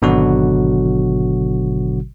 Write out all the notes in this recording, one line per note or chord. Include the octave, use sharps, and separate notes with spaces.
G#1 B2 D3 F#3 F#4